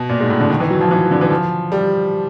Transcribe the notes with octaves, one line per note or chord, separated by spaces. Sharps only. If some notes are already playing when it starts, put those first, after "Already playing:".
Already playing: B2
A#2
G#2
A2
D3
D#3
E3
F#3
F3
E3
D3
E3
F3
G3